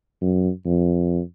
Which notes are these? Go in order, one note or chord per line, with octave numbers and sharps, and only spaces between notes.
F#2
F2